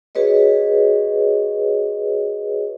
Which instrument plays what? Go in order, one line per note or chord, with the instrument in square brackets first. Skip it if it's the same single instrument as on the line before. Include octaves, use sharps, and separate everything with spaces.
[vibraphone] F#4 G#4 B4 C#5 D#5